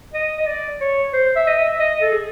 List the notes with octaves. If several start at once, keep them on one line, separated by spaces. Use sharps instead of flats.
D#5
D#5
D5
C#5
C5
E5
D#5
E5
D#5
A4
G#4